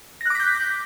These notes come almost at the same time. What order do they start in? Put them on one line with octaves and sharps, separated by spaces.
A#6 F#6 D6 B6 G6